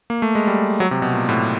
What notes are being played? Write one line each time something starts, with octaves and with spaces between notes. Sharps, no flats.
A#3
A3
G#3
G3
F#3
C3
B2
A#2
A2